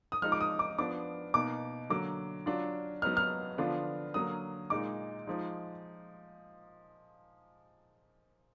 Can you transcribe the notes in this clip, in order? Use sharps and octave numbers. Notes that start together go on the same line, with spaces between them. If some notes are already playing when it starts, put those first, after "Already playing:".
D#6
F3 G#3 D#4 F6
D6
D#6
D6
F3 B3 D4 D6
B2 A#3 D#4 D6
D3 F#3 A#3 D6
F#3 D4 F4
F#3 B3 D#4 F6
F6
D3 F3 B3 D4 F4
D3 F#3 A#3 D#6
A#2 G#3 D#4 D6
F3 G#3 D#4